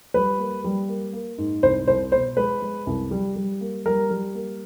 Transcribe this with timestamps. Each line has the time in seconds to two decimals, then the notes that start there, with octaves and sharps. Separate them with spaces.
0.14 G3 B4
0.39 A#3
0.64 G3
0.89 A#3
1.13 A#3
1.38 G#2
1.63 C2 C5
1.88 C2 C5
2.12 B2 C5
2.37 G#3 B4
2.62 G#3
2.87 C2
3.11 G3
3.36 G3
3.61 A#3
3.86 G3 A#4
4.10 G3
4.35 A#3